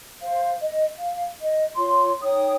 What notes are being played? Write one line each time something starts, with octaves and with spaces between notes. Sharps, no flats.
C5 F5
D#5
F5
D#5
F4 C#5 C6
D#4 C#5 G5 D#6